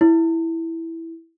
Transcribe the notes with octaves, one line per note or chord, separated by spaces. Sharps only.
E4